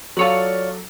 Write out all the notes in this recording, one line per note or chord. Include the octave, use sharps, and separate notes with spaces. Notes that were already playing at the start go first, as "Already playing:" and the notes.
F#3 F4 A4 C#5 D5